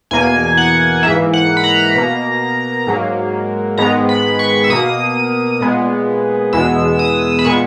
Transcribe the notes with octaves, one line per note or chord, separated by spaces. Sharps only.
E2 B2 A#3 G#5
F#5
G#2 E3 A#3 E5
F#5
B5
A#5
B2 A#3
G#2 F#3 A#3
G#2 D#3 G#3 B3 A#5
B5
C#6
E6
B2 A#3 D#6
A#2 G#3 B3
E2 B2 G#3 B3 E6
D#6
B5
A#2 G#3 B3 C#6